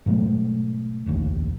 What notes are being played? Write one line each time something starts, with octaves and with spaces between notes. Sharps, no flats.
G#2 B2 F#3 A3
F1 A#1 D#2